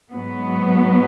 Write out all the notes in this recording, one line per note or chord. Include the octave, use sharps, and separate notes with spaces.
G#2 F#3 B3